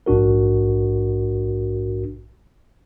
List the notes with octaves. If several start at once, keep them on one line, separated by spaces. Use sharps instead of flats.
A#1 G#2 D4 F#4 A#4